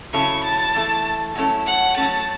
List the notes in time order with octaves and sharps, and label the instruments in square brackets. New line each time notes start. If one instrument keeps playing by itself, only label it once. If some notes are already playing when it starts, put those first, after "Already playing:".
[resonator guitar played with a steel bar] C#3 F#3 C#4 E4 A4 [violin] C#6
[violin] A5
[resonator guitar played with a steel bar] E3 A3 E4 A4
F#3 A3 C#4 E4 A4
[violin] F#5
[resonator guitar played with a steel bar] F#3 A3 C#4 [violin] A5